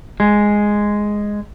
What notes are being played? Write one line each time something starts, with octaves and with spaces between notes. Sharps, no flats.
G#3